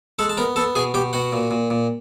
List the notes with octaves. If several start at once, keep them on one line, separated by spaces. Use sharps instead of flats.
G#3 A4 A5
A5
B3 A#4 A#5
B3 A4 A5
B2 G#4 G#5
B2 G4 G5
B2 F#4 F#5
A#2
A#2
A#2